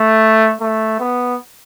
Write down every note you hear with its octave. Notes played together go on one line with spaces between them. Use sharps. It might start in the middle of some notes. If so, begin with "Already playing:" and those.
Already playing: A3
A3
B3